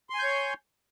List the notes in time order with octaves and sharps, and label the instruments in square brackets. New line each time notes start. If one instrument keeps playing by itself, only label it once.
[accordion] C6
G#5
G6
C#5